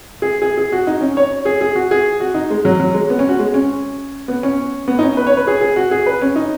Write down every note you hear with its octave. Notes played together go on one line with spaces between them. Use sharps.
G#4
G#4
G#4
F#4
D#4
C#4
C#5
G#4
G#4
F#4
G#4
F#4
D#4
G#3
F#3
F#3
G#3
B3
C#4
F#4
G#3
C#4
B3
C#4
B3
D#4
C#4
B4
C#5
B4
G#4
G#4
F#4
G#4
B4
C#4
D#4